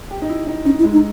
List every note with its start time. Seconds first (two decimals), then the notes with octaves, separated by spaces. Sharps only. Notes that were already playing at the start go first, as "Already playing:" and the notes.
0.11 G4
0.22 D#4
0.29 E4
0.47 D#4
0.65 C#4 D#4
0.79 E4
0.84 G#3
0.93 D#4